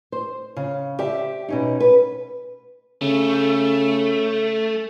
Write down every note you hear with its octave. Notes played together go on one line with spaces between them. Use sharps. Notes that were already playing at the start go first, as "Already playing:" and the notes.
C5
C#3
G4 C5 D5 E5 G5
B2 C#4 D#4
B4
C#3 A3